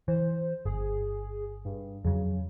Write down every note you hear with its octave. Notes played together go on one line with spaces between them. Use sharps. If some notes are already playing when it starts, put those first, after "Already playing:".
E3 C5
G1 G#4
G2
F2 C#3 F#3